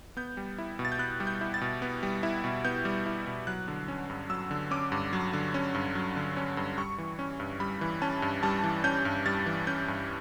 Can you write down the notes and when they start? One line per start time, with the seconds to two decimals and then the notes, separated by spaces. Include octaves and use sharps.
0.17 B3 G6
0.37 G3
0.58 E4
0.79 B2
0.85 A6
0.92 G6
0.99 B3 F#6
1.20 G3
1.27 G6
1.41 E4
1.54 A6
1.61 B2
1.82 B3
2.03 G3
2.23 E4
2.44 B2
2.65 B3 G6
2.85 G3
3.06 E4
3.27 B2
3.47 F#3 F#6
3.68 D3
3.88 C#4
4.10 G2
4.30 F#3 E6
4.51 D3
4.71 C#4 D6
4.92 G2
5.13 F#3
5.33 D3
5.54 C#4
5.74 G2
5.95 F#3
6.16 D3
6.37 C#4
6.57 G2
6.78 G3 C#6
6.98 E3
7.19 C#4
7.40 G2
7.60 G3 B5
7.81 E3
8.02 C#4 A5
8.22 G2
8.43 G3 A5
8.64 E3
8.84 C#4 G6
9.05 G2
9.26 G3 A6
9.46 E3
9.67 C#4 G6
9.88 G2